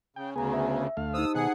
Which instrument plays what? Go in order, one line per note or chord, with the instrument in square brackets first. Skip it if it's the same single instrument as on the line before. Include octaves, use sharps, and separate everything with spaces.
[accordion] C#3 [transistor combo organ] G5
[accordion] D2 C#3 [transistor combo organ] B3 G#4 [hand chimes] G#5 A#5
[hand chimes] E5
[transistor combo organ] D2 A3 F5
[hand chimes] D#4 G4 C5 [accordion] D#6 E6
[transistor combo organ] B2 D#3 [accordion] G#4 F#5